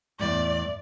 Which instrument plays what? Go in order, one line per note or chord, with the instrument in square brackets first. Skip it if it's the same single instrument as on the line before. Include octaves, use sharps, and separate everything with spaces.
[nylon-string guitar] E2 A2 [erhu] D5